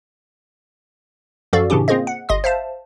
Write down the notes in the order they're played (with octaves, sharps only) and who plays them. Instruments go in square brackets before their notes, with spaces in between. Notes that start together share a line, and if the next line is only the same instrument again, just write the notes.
[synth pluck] F#2 F3 F#4 A4 D5 F5
A2 C#3 E3 C#4 D4 G4
A#3 C4 F4 G#4 C5 D#5
F#5
G1 D#5 C6 D#6
C5 E5 F5 A5